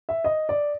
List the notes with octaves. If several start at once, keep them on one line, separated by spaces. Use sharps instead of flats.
E5
D#5
D5